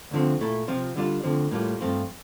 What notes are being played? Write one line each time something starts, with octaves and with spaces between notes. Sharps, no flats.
D2 D3 F3 C4
A#2 A3 E4
C3 F3 C4 F4
D3 G3 D4 F4
D2 D3 F3 C4
A2 G3 A#3 F4
G2 F3 A3 C4 F4